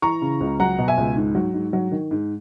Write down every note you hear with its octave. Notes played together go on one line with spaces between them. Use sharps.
E3 A#5 C#6
C#3
C#2
F#3 F#5 A#5
B2
E5 G#5
C#2
G#2
F#3
G#2
F#3
D#3
G#2